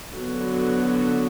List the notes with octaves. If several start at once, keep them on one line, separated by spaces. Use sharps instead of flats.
D3 F#3 B3 F#4